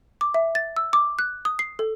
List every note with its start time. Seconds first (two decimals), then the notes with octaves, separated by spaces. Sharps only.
0.21 D6
0.34 E5
0.55 A6
0.76 E6
0.93 D6
1.19 F#6
1.45 D#6
1.59 C7
1.79 A4